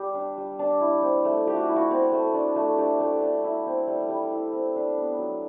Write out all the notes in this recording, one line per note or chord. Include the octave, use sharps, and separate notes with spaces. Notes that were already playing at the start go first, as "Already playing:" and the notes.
Already playing: G3 G4
D4
G3
D4
E4
C4
A3
A3 G4
F#4
E4
F#4
C4
A3
D4
A3
D4 G4
A3
D4
E4
C4
G3
G3
E4
C4
D4
B3
F#3